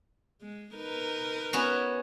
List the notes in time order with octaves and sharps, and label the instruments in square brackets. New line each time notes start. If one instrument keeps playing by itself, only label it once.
[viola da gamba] G#3
D#4 A#4 B4
[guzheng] B3 C#4 F#4